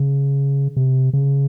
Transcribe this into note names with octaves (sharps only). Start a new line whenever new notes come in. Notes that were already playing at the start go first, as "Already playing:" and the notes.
Already playing: C#3
C3
C#3